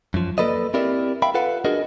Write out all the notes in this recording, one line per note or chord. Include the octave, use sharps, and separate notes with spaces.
F#2 F3
A#3 A4 B4 D5 D#5
C4 E4 G4 A#4 D5
E5 F5 G5 B5
F4 A4 B4 F5 F#5
D4 F#4 G#4 A#4 D#5